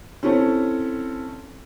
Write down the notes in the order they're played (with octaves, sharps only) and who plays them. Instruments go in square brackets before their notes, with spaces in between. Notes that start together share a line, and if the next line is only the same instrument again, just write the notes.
[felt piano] C4 C#4 E4 A4 C#5